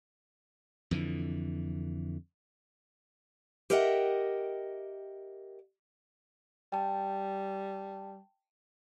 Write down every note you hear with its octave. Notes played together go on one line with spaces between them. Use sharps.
F2 D3 E3
G4 A#4 D#5 E5 F#5 G5
G3 G5 A5